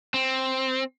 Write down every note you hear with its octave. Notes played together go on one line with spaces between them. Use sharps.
C4